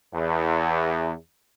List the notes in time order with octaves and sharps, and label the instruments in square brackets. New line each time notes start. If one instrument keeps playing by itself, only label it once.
[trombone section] E2